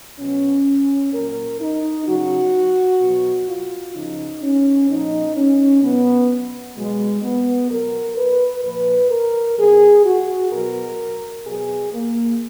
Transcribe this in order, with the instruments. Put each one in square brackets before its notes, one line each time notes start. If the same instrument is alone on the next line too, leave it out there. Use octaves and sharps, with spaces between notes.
[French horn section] B2 F#3 C#4
A#2 F#3 A#4
D#4
C#3 F#3 F#4
B2 F#3
F4
C#3 F3 D#4
C#4
A#2 F3 D#4
C#4
B2 F#3 B3
B2 F#3 G#3
B3
B2 F#3 A#4
B4
A#2 F3 B4
A#4
B2 F#3 G#4
F#4
B2 F#3 A#4
B2 F#3 G#4
A#3